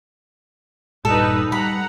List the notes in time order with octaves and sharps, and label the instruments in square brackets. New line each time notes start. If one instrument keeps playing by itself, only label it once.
[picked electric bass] D#1 G2 A#2 [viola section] G3 D#4 B4 [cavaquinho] A4
[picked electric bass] G3 [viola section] F#5 A#5 [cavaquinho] B5